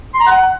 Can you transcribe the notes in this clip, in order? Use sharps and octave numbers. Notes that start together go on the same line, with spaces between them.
C6
A#5
F#5